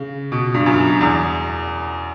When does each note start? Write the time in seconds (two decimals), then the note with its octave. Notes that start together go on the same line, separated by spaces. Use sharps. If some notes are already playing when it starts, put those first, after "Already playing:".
Already playing: C#3
0.32 B2
0.54 G2
0.66 F#2
1.01 E2